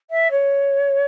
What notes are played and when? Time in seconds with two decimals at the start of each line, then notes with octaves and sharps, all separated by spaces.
0.10 E5
0.31 C#5